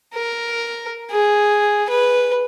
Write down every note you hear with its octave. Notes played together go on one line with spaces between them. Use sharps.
A#4
G#4
B4